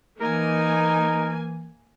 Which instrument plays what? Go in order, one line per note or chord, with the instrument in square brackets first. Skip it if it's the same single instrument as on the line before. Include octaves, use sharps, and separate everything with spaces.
[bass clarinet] E3 [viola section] A#3 G#5 [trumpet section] D#4 [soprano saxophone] A#4